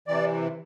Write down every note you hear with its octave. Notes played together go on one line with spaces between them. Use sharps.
C3 E3 D5